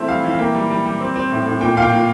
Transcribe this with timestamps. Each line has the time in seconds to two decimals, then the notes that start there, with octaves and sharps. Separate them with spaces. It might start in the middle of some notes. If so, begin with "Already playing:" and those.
Already playing: E3 A3 C4 E5
0.08 G3 F5
0.24 E3
0.30 F5
0.39 A#3 G5
0.55 G3
0.70 G3
0.86 G3
1.00 C4
1.16 C4
1.31 A2
1.46 A2
1.61 A#2 G5
1.77 A#2 F5
1.82 G5
1.92 A#2